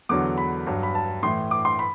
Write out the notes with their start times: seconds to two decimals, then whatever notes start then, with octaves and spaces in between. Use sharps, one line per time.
0.09 E2 D3 F#3 D6
0.38 B5
0.67 G2 F#3
0.83 B5
0.95 A5
1.23 A2 E3 C6
1.51 D6
1.65 C6
1.79 B5